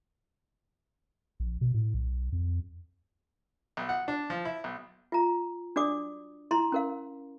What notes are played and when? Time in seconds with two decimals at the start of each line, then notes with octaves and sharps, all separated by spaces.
1.40 A#1
1.61 B2
1.74 A2
1.94 B1
2.32 F2
3.77 B1
3.89 F#5
4.08 D4
4.30 F3
4.45 E4
4.64 B1
5.12 F4 A#5
5.76 D4 F#4 D5 D6 D#6
6.51 E4 A#5 C6
6.72 C#4 A#4 F5